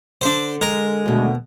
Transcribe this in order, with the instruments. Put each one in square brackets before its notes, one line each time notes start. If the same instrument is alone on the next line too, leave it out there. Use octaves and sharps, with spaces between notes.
[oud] D3 [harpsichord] D4 C5
[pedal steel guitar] G#3 [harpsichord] A#4
[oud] D#2 B2 [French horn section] D3 A3 F#4